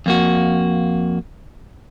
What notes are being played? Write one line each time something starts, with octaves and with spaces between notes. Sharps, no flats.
F2 A#3 F#4